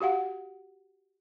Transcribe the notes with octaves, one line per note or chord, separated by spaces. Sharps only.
F#4 G4 F5 F#5